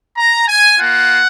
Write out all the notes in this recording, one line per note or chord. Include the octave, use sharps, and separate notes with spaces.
A#5
G#5
A#3 F4 F#5